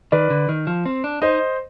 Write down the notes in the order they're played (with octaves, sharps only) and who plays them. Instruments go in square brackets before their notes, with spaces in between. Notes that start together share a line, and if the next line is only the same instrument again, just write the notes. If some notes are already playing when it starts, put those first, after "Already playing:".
[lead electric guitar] D#3 [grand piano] B4 D5
[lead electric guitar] D3
D#3
F3
C4
D4
[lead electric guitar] D#4 [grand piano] C5 D#5